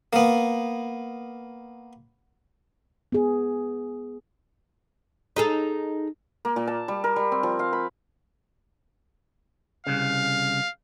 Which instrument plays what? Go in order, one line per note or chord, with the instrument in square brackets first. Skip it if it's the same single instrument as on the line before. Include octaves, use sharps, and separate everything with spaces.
[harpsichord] A#3 B3
[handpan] B3 G#4
[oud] D#4 G#4 A4
[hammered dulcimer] A#3
A#2
A5
G3
A#4
G3
C4
F3
F5
B5
[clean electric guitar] C2 C#3 [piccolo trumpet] F5